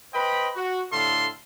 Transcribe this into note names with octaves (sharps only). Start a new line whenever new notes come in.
B4 C5 D#5 G5 B5
F#4
A2 D3 G3 A4 F5 C6